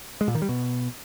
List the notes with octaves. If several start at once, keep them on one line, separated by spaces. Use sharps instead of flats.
G#3
A#2
D#3
G3
B2